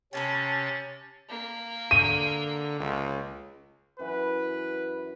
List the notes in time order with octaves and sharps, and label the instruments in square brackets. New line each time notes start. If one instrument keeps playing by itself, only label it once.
[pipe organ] C3 C#4 A6 [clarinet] C#5 [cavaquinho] G#5 A5 B5
[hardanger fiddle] A#3
[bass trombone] D3 [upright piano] D#7
[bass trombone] C#2
[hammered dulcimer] F#2 E3 F#5 [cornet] B4